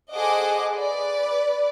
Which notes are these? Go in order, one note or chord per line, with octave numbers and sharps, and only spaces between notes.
G#4 A4 C5 D#5 F#5 D6
B4 D5